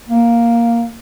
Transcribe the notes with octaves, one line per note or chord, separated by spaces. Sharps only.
A#3